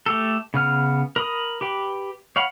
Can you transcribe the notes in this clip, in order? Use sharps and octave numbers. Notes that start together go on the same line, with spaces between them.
A3 G4 A4
C#3 B3 F6
A#4 B5 D#6
G4 B4 G5
C#5 F5 F#5 B5